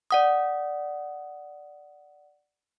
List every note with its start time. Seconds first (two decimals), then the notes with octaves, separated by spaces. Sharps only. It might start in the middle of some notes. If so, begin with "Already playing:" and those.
0.11 D5 F#5 D#6